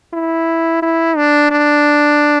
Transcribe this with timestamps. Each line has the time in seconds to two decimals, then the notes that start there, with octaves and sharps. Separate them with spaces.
0.13 E4
0.82 E4
1.16 D4
1.51 D4